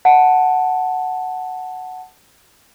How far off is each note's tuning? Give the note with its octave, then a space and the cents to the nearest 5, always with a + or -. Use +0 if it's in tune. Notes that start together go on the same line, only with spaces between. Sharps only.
F#5 +0 A5 +0